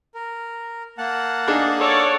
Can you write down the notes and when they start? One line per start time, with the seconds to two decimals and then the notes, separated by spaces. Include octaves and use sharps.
0.15 A#4
0.98 A#3 F#5 A5
1.48 D4 D#4 G#4
1.78 A4 C#5 D5